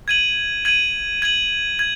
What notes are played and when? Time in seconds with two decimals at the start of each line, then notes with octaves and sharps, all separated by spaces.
0.08 G#6 D#7 F#7
0.65 G#6 D#7 F#7
1.22 G#6 D#7 F#7
1.79 G#6